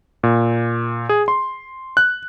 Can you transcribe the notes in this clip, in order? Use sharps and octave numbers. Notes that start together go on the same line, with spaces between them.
A#2
G#4
C6
F#6